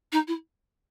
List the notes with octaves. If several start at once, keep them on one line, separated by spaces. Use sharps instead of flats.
D#4
E4